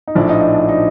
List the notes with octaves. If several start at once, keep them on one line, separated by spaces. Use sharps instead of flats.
D#4
A#1 A2 F3 D4
D#4
D#4
D4
D#4